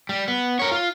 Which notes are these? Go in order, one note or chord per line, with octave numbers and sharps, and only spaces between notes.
G3
B3
A#4 C#5
F4